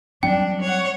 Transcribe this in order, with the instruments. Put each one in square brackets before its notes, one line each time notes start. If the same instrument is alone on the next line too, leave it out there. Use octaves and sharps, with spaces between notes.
[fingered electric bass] F#3 G3 C4 [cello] D4 [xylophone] G5
[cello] C#5 F#5